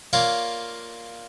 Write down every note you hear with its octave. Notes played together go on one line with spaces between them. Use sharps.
A#3 F4 C#5 D5